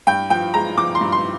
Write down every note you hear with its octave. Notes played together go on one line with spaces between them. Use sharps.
G2 G5
F3 G5
G#3 A#5
F3 D6
C6
G2
C6